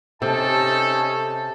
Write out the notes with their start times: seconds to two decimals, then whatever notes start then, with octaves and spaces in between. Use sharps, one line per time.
0.22 C3 C#4 D#4 A4 A5